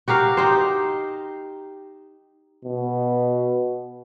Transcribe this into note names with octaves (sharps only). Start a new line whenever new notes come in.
F#4 G4 A#4 F5
D#4 G4 C5
B2